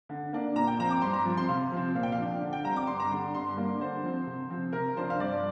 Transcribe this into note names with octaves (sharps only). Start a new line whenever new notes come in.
D3
A#3 D4
A#2 A#5
G5
F3 C4 A#5
D6
G2 C6
A#5
F3 C4
C6
C3 F5
F3 C4
A#2 F5
G5
F5
F3 D4
D3
G5
G3 C4 A#5
D6
G2 C6
A#5
D3 G3 C6
G2 C6
G3 A#3 D4
D3 C5
F3 C4
C3
F3 C4
C3 A#4
F3 D4 C5
F5
G2 D5